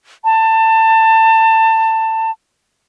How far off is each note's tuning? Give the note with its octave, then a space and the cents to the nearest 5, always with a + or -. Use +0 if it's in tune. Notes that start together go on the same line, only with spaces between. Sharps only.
A5 +25